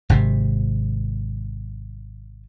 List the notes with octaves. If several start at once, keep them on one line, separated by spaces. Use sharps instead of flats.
G#1 C3